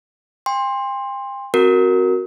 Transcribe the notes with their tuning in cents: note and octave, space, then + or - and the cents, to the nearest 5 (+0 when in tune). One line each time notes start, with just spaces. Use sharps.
G5 +40 C6 +10
C4 +0 F#4 +0 A#4 -10